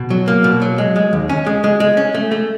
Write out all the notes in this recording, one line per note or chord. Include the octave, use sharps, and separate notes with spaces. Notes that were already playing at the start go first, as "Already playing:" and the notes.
Already playing: B2
F#3
A#3
B2
F#3
G#3
G#3
D#2
C#4
G#3
G#3
G#3
C#4
A3
A3